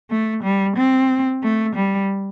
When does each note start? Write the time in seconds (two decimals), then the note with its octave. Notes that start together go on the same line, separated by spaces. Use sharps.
0.10 A3
0.43 G3
0.77 C4
1.43 A3
1.76 G3